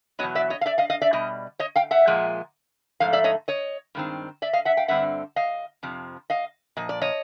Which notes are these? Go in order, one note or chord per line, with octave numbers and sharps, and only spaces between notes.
E2 B2 F#3 B3 C#5 D#5
D5 E5
C#5 D#5
F5
D5 E5
D#5 F5
D#5 F5
D5 E5
B2 G3 D#5
C#5 D#5
F5 G5
E5 F#5
A#2 F3 G#3
G#2 F3 A3 F5
D5 E5
C#5 D#5
C#5 D#5
G2 D#3 G#3 C4
D5 E5
D#5 F5
E5 F#5
F5 G5
G2 D3 G3 C4 E5 F#5
D#5 F5
F2 C3 F3
D#5 F5
A#2 F3 D#5
D5
C#5 D#5